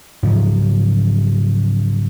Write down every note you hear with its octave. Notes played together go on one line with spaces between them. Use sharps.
G#2 C#3 F3 F#3